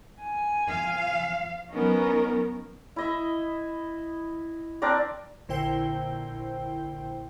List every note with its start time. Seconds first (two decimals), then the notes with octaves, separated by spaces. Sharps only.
0.21 G#5
0.69 F3 F5
1.71 F#3 B3 C#4 D#4 A#4
2.96 E4 D#5 E5
4.82 C4 D4 A#4 D5
5.48 A#1 A#2 D3 E4 C5 G5